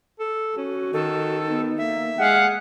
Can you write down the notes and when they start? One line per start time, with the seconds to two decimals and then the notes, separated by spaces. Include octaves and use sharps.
0.20 A4
0.58 C#4 F#4
0.93 D#3 A4
1.44 B3 D#4
1.78 A#3 E5
2.19 G#3 G#4 D#5 F5 F#5